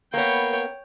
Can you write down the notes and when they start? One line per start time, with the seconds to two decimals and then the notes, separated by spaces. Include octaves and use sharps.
0.14 A#3 B3 C#5 G5